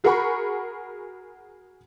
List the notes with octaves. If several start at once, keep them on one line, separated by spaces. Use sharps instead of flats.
F#4 G#4 A#4 F#5 B5 C#6